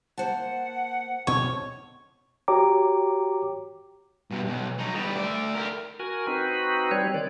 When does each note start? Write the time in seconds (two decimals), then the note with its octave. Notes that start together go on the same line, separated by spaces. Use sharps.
0.18 A#3 C5 F#5 A5
1.27 D2 B2 C4 C#5
2.48 F#4 G4 C#5 G5 A#5 D6
4.31 G2 B2
4.46 B1
4.78 F#3 D#4
4.95 G3 B3
5.15 A3 D5
5.55 G4 A#4
5.99 F#4 A#4 G#5
6.27 C4 D#4 F#4 B4
6.91 G3 C4 C#5
7.14 D#3 D5